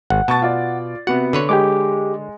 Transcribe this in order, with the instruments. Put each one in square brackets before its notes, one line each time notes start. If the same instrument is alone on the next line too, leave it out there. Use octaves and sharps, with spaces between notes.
[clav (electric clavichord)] G#1 [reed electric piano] F#5
[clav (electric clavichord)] B2 [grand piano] A5 C#6 A6
[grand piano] F4 D5
[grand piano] C3 B3 C#7 [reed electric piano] F#4 [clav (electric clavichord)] F#5
[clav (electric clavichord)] D3 B4 C#5
[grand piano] G#3 [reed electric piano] G4 G#4 D6